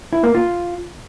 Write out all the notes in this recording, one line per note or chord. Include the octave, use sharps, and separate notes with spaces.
E4
A#3
F4